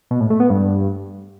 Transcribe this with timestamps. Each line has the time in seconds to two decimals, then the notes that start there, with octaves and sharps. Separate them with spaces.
0.11 B2
0.20 A2
0.30 A3
0.40 B3
0.50 G2